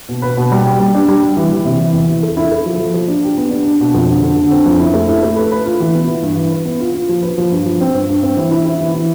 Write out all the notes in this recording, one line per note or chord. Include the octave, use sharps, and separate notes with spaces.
B2
B4
B2
G3
G4
G3
D4
G3
G4
E3
E3
C3
E3
E2
E3
A4
E4
A4
F3
F3
F3
D4
G4
B3
D4
D4
B2
F2
D3
D3
D3
C4
F2
E4
A3
E4
A3
B4
B4
F4
E3
B3
E3
G2
E3
B4
B3
F4
F4
F3
B4
F3
G2
F3
C4
G2
G2
C4
E3
E4
E4
E3
E3